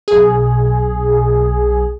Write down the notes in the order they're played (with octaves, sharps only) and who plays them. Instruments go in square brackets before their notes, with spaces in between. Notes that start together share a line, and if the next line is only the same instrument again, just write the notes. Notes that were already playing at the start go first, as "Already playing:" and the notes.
[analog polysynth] B1 G#4